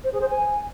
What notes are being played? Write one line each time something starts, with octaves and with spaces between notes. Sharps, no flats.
C5
G#4
C5
G#5